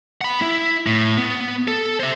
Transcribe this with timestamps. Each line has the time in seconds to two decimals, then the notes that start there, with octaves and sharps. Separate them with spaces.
0.21 F#5 B5
0.42 E4
0.86 A2
1.17 B3
1.68 A4
2.00 C5 E5